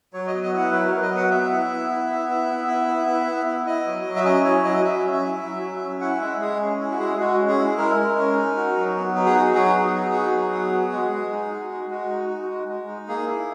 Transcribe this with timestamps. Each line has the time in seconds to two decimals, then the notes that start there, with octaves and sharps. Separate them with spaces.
0.13 F#3 C#5
0.27 D#5
0.33 B3
0.43 D#5
0.53 E4 F#5
0.71 F#3 B4
0.87 A#4
0.92 F#3
1.02 D#5
1.11 B3
1.16 F#5
1.31 B3 E5
1.51 E4
1.70 B3
1.90 E4
2.10 B3
2.29 E4
2.49 B3
2.68 E4
2.88 B3
3.08 E4
3.27 B3
3.46 E4
3.66 E4 D#5
3.86 F#3
4.06 F#3
4.16 E5
4.25 C#4 D#5
4.44 E4 C#5
4.64 F#3 D#5
4.84 F#3 E5
5.04 C#4
5.13 E5
5.24 E4
5.43 F#3
5.63 F#3
5.81 C#4
6.01 E4 F#5
6.21 G#3 E5
6.41 G#3 G#4
6.60 C#4
6.81 E4
6.91 F#4
7.00 G#3 G#4
7.19 G#3 F#4
7.38 C#4
7.48 G#4
7.59 E4
7.78 G#3 A#4
7.97 G#3
8.17 C#4
8.36 D#4
8.57 F#4
8.77 F#3
8.96 B3
9.16 D#4
9.26 G#4
9.35 F#4
9.54 F#3 G#4
9.74 B3
9.94 D#4
10.13 F#4
10.33 F#3
10.52 B3
10.72 F#4
10.92 G#3
11.12 G#3
11.31 D#4
11.50 F#4
11.70 G#3
11.90 G#3 F#4
12.09 D#4
12.29 F#4
12.49 G#3
12.68 G#3
12.88 D#4
13.08 A#3 G#4
13.27 E4